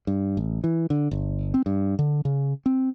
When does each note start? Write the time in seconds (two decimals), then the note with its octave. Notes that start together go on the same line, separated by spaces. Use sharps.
0.07 G2
0.37 A1
0.64 E3
0.90 D3
1.11 G1
1.54 C4
1.66 G2
1.99 D3
2.25 C#3
2.66 C4